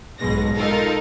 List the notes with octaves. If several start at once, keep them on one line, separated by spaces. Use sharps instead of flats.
B1 G#2 B2 G#3 A#6
D#4 F4 A4 A#4